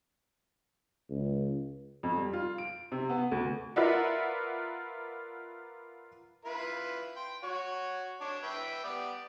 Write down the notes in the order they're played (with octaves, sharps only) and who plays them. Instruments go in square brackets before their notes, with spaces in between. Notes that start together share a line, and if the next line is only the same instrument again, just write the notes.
[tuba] C#2
[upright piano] F2
G3
F4
D7
C3
B3
D2
[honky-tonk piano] F4 A#4 B4 D5 E5 F#5
[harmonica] E4 F4 B4
G5 C6
F#4 C#5
D4 C#5
B4 E5 G5
B3 G4 D5